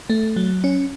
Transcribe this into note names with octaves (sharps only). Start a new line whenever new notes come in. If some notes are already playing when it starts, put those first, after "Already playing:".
A3
F#3
C#4